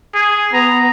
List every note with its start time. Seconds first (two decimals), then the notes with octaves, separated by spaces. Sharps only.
0.14 G#4
0.53 B3 A#5